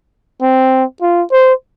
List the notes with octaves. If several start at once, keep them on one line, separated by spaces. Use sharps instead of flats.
C4
F4
C5